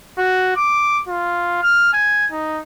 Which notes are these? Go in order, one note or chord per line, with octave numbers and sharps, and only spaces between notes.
F#4
D6
F4
F6
G#5
D#4